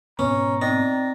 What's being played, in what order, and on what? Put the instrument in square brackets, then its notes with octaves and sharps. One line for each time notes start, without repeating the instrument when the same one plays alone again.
[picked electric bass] G#2 B2 B3 [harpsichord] C#4 [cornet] A#5 [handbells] C#6
[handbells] C4 D5 A#6 [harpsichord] D#4